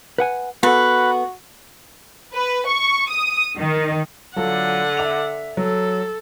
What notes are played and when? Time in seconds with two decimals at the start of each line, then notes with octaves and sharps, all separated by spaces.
0.18 B4 F#5 G#5
0.63 B3 F#4 A4 B4
2.33 B4
2.67 C#6
3.10 D#6
3.58 D#3
4.36 D3 F#3 F4 A4 F#5
4.97 E5 D6 F7
5.57 F#3 A4